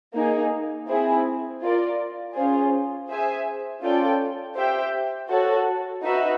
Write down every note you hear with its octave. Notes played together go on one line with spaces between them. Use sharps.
A#3 D#4 G#4
C4 E4 G#4
F4 A#4 D5
C#4 F4 G#4 C5
G#4 C5 E5 G#5
C#4 F4 A4 D5 G5
G4 C5 E5 G5
F#4 A4 C#5
D#4 F#4 B4 E5